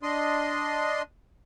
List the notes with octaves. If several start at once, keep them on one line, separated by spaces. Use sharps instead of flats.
D4 D#5 C6